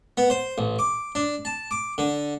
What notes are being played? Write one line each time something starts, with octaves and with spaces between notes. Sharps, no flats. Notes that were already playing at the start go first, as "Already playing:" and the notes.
B3
C5
A1
D6
D4
A5
D6
D3